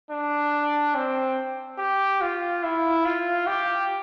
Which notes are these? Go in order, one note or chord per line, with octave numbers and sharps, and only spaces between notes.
D4
C4
G4
F4
E4
F4
G4